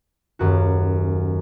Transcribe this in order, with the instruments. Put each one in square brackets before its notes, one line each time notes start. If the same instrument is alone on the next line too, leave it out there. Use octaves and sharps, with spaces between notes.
[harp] D#1 F#2 F#4